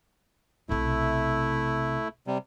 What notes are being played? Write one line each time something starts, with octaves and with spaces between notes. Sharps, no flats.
B1 C3 A3 E4
C3 G3